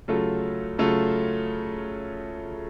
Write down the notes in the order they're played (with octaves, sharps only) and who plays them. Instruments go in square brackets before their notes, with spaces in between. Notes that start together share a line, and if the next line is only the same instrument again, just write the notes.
[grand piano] C#3 F#3 A3 F4 A4
C#3 F#3 A3 F4 A4